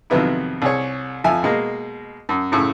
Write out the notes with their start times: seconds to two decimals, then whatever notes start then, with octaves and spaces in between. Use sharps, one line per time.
0.10 F2 C3 D#3 F#3 B3 E4
0.62 C2 G#4 C#5
1.24 F2 F3 E5 G#5 E6
1.43 B2 G#3 A#3
2.29 F#2
2.52 F#2 A2 C#3